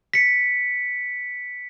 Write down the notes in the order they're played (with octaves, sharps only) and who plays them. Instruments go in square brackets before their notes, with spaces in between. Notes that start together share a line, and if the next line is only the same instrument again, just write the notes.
[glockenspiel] B6 C#7